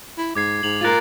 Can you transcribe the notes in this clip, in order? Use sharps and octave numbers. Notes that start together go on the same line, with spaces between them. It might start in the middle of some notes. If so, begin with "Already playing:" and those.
E4
G#2 D6 G#6 C7
G#2 F7 F#7
F4 A#4 F#6 A6